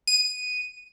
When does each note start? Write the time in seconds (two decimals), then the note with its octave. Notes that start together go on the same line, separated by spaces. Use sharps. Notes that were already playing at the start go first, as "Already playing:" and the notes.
0.07 D#7